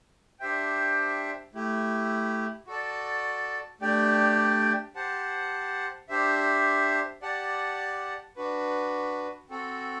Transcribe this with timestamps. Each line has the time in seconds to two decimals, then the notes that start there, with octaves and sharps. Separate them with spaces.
0.40 D4 G4 C5 E5 G5
1.54 A3 E4 G4
2.67 F#4 A4 D5 A5
3.81 A3 D4 G4 D5 G5
4.95 G4 C5 F#5 A5
6.09 D4 G4 C5 E5
7.22 G4 D5 F#5 A5
8.36 D4 F#4 B4
9.49 C4 F#4 A4